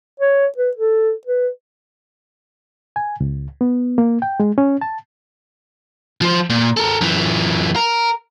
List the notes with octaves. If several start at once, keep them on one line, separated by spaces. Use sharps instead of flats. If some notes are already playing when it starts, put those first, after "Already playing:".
C#5
B4
A4
B4
G#5
C#2
B3
A#3
G5
G#3
C#4
A5
F3 C5
A#2
A4 A#4
F#2 E3
A#4